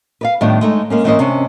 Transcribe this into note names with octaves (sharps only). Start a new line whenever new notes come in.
B4 D5 F5
A2 D#3 G3 B3 D4 F4
G#3 A3 D#4
G#3 A#3 C#4
G#2 E3 A#3 C#4 C5 D#5
C3 C#4 D4